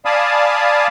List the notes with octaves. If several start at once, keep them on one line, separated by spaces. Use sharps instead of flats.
D5 F5 G#5 A5 B5 D#6